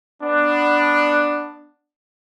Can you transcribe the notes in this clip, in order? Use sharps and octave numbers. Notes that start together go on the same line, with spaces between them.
B3 D4